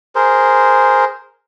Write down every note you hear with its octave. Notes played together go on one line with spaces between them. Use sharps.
G#4 A#4 C5